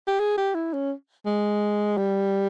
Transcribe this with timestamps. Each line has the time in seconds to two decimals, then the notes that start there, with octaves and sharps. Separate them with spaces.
0.07 G4
0.20 G#4
0.38 G4
0.55 E4
0.73 C#4
1.26 G#3
1.97 G3